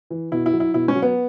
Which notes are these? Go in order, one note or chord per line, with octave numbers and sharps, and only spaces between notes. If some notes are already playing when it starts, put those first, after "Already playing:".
E3
B2 E4
E4
F#3
E4
B2 E4
C#4
F#3
B3